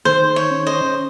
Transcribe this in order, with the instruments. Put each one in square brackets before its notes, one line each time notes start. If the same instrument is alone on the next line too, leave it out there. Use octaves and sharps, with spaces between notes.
[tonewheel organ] D#3 [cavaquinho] C5
[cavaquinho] C#5
[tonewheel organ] C#4
[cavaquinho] C5 D#5